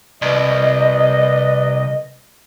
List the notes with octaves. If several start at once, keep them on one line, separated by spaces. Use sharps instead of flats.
C2 B4 D5 D#5